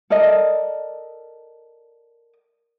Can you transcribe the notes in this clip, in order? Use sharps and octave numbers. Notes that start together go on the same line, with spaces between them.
A4 A#4 D5 D#5